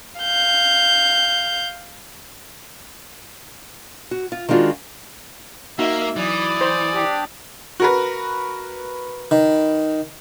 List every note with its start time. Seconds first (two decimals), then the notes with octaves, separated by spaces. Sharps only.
0.21 F5 G6
4.11 F#4
4.32 F4
4.49 D#3 G#3 D4 F4 F#4
5.79 A#3 D#4 F#4 E5
6.16 E3 F#3 D5 D#6
6.61 C5
6.94 D4 G4
7.80 F#4 A#4 B4
9.31 D#3